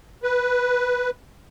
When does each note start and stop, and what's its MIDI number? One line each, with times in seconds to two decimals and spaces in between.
0.23 1.10 71